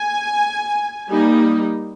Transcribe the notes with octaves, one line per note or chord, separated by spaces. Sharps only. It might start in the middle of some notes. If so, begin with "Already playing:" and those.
Already playing: G#5
G3 A#3 D#4